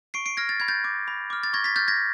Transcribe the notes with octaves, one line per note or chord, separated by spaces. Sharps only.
C#6 C7 D7
C7 D7
F6 G#6 A#6
A6
B5 G#6
G6 A6
D6 G6
B5
D6 F6
A6
C#6 G#6 A#6
A6 B6
F6 G6 A6
G#6 A#6